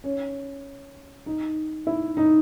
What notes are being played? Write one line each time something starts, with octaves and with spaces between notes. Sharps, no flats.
C#4
D#4
E4
D#4